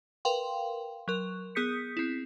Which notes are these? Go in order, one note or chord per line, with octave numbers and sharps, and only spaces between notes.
A#4 B4 F5 G5 C6
F#3 A#4
B3 G#4 D#6 G6 B6 C#7
C4 E4